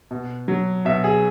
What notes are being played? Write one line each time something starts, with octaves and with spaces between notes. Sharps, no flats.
B2
F#3
B2 E5
G#4